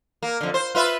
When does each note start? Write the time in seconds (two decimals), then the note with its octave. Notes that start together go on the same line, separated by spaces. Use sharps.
0.23 A#3
0.41 F2 D3
0.54 C5
0.75 F4 B4 E5